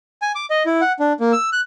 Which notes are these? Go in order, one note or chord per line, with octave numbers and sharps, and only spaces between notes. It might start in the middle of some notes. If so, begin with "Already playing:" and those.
G#5
D6
D#5
E4
F#5
D4
A#3
E6
F#6